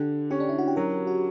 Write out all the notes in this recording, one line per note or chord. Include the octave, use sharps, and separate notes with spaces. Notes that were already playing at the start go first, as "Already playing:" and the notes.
Already playing: D3 G4
C#4 G4
D4
E4
F#4
G4
F#3 A#4
F#4